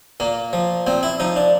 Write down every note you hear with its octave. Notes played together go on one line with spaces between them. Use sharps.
A#2 A#3
F3
A#2 C4
E4
F3 D#4
D4